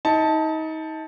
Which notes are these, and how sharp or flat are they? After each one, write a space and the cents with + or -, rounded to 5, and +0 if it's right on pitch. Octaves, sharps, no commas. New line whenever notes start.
D#4 +30 A5 +0